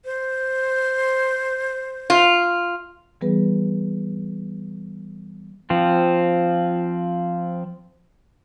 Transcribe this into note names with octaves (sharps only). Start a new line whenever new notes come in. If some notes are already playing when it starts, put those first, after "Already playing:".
C5
F4
E3 G3 B3 G#4 B4
F3 C4